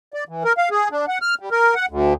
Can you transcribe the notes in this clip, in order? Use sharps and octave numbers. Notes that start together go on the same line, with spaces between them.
D5
E3
A#4
F5
G#4
D4
F#5
F6
G3
A#4
F#5
D2